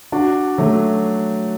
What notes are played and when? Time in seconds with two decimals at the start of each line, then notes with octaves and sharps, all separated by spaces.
0.12 D4 F#4
0.58 F#3 A3